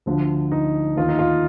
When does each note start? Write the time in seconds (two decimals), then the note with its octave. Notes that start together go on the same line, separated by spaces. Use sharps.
0.06 D2 D3 F3
0.52 D#4
0.97 D#2 D#3 F4
1.09 D#4
1.19 F4